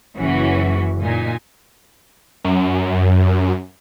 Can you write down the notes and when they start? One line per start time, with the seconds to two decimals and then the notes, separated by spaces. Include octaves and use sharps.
0.17 F#1 E3 C#4 F#4
1.04 A#2 D#4 G#5
2.45 F#2